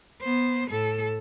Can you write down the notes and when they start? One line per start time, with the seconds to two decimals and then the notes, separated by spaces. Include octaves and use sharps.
0.22 B3 C5
0.69 A2 A4